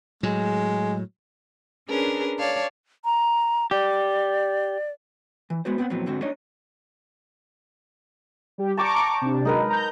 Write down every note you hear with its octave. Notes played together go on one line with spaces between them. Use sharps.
A2 F#3 G#3
C#4 D4 G#4 A#4 B4
C#5 D5 F5 A5
A#5
G4 D5
E3
G#3 B3 F#4 C5
B3 C4 C5 F#5
F2 A#2 E3 F#3 B3 C4
G#2 D3 C4 F#4
D4 D#4 C#5 D#5
G3 G4
D5 G5 A5 A#5 C#6 D6
C3 D4
F#3 G#3 D#4 A#4 B4
A#5 G6